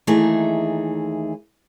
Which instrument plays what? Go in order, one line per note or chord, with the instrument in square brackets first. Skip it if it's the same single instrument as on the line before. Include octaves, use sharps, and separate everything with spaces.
[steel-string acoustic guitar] D#2 E3 A3 D#4 G#4 E5